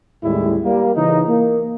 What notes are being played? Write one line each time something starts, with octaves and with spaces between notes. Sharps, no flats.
A1 D#2 A2 G3 G#3 E4
G3 A#3
C#3 E3 D#4
A#3